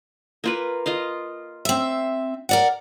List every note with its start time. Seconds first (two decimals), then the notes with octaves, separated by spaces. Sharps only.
0.44 A#3 F4 B4
0.86 F4 D#5 F5
1.65 C4 E5
2.49 A#4 D5 F#5